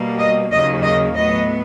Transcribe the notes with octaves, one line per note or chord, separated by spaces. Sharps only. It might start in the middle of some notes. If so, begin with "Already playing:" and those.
Already playing: B2 G3 A#3
D#5
D#2 C#3 F#3 A#3 D#5
D#5
A2 F#3 B3 D#5